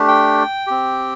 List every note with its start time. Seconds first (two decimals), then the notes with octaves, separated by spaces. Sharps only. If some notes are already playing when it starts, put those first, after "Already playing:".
Already playing: A3 D4 G4
0.08 G5
0.67 C4 G4